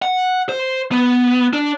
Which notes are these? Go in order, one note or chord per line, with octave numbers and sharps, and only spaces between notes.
F#5
C5
B3
D4